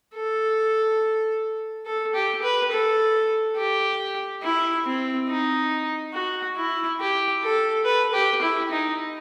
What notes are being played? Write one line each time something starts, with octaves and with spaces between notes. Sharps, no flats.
A4
A4
G4
B4
A4
G4
E4
C4
D#4
F#4
E4
G4
A4
B4
G4
E4
D#4